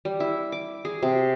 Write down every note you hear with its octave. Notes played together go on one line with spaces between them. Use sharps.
G3
E4
D6
G#4
C3